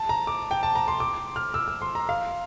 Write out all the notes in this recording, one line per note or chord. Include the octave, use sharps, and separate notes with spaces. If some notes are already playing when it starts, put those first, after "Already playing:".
Already playing: A5
A#5
D6
G5
A5
A#5
C6
D6
F6
E6
E6
C6
A#5
F5